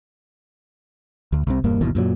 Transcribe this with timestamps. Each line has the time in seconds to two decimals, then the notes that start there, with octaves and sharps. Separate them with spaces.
1.32 D2
1.47 C2 C3
1.64 E1 G2 A#3
1.81 G1 D#2 B2 E3
1.95 F#2 A#2 E3 F#3